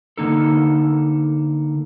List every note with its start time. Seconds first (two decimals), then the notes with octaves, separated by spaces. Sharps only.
0.17 D3 A#3 D#4 A4